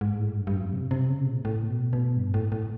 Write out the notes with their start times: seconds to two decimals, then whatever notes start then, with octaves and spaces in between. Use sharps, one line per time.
0.01 G#2
0.19 A2
0.37 G2
0.47 G2
0.56 F#2
0.73 C3
0.91 C3
1.10 C#3
1.27 A#2
1.45 A2
1.69 B2
1.93 B2
2.17 G2
2.34 A2
2.52 A2